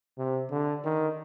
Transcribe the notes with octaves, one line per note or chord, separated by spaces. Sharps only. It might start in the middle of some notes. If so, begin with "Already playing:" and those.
C3
D3
D#3